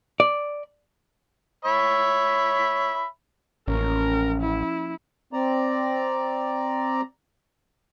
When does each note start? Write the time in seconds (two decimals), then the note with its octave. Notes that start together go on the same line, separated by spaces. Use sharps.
0.20 D5
1.65 C#5 E5 B5
3.68 A1 F3 A#3 C#4 A#4
4.41 E4
5.33 C4 D5 A#5